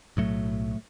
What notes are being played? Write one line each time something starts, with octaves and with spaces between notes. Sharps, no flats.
B1 A2 F#3 A3